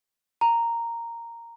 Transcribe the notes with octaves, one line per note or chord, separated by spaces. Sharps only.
A#5